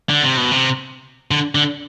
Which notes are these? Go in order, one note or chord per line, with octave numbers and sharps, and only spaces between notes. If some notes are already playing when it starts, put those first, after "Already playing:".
D3
C3
B2
C3
D3
D3